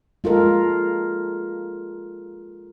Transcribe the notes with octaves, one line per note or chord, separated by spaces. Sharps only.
G#3 F4 A4 A#4